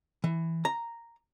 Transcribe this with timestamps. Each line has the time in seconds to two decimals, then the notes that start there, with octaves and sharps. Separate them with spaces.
0.24 E3
0.65 A#5